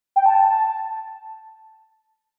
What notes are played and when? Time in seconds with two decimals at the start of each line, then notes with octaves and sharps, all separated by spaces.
0.16 G5
0.26 A5